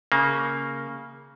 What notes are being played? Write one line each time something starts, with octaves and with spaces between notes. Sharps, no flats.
C#3 A#3